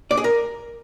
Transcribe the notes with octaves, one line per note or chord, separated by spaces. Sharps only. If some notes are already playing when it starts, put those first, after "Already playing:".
D5
G#4
A#4